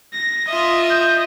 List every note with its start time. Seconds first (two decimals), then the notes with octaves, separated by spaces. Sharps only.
0.13 A#6
0.48 F4 D#5 E5
0.90 G6